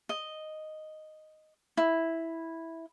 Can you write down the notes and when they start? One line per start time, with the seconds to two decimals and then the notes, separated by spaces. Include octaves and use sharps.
0.09 D#5
1.77 E4